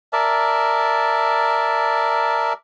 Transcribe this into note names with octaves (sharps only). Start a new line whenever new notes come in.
A#4 D5 E5 A5